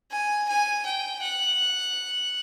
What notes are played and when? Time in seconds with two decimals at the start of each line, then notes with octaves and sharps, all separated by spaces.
0.11 G#5
0.49 G#5
0.86 G5
1.23 F#5